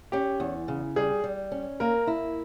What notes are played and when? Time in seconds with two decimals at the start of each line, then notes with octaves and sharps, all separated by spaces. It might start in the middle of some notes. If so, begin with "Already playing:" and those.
0.12 C#4 G4
0.40 E2
0.68 C#3
0.96 G3 G#4
1.24 G3
1.52 C#4
1.80 A#3 A#4
2.07 E4